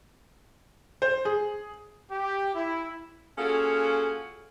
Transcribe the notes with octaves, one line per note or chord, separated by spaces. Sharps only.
C5
G#4
G4
E4
A#3 C#4 F4 F#4 G#4 A4